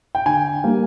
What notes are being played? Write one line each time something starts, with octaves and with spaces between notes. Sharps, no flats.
G5
D3 G#5
G3 A#3